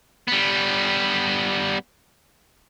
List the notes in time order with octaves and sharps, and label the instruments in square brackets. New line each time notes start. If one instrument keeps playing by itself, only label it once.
[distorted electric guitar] G3 B3